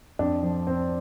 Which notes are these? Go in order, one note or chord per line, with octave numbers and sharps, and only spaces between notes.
F2 D4
F3
F2 C4